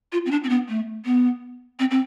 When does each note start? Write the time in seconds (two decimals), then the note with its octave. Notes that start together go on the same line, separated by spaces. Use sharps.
0.12 F4
0.26 C4
0.31 D4
0.44 C4
0.49 B3
0.69 A3
1.05 B3
1.79 C4
1.91 C4